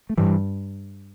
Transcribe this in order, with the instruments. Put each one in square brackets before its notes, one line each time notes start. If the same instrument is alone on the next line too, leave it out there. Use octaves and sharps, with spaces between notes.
[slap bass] A3
[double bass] G2 [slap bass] E3 G3